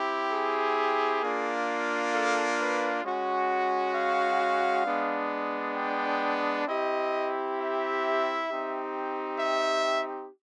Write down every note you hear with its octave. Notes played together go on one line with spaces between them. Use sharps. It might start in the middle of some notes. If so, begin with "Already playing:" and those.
Already playing: C4 E4 G4
G#4
A#3 D4 F4
A4
B4
G#3 C#4 F#4
F5
G#3 B3 D4
G5
C4 E4 G4 D#5
E5
C4 D#4 G4
E5